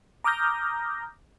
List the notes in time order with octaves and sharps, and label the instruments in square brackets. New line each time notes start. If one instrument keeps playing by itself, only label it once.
[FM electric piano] A#5 D6 D#6 F6 G6 A#6